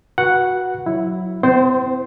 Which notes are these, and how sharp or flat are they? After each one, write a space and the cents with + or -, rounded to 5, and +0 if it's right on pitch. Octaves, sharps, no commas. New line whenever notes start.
F#4 -5 B4 -30 F#5 +0
F#3 +0 E4 +0
C4 -40 E4 +0 C5 +0